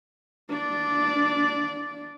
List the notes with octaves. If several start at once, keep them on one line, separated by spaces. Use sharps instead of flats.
D4 D5